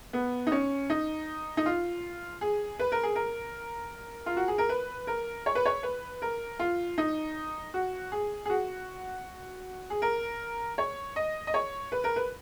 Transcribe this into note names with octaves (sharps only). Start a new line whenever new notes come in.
B3
D#4
C#4
D#4
D#4
F4
G#4
B4
A#4
G#4
A#4
F4
F#4
G#4
A#4
B4
A#4
C#5
B4
C#5
B4
A#4
F4
D#4
F#4
G#4
G#4
F#4
G#4
A#4
C#5
D#5
D#5
C#5
B4
A#4
B4